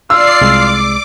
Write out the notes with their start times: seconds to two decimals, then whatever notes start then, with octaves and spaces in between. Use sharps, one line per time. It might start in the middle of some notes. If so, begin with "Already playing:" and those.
0.10 F4 D5 E6 C7
0.41 C2 G#3 D6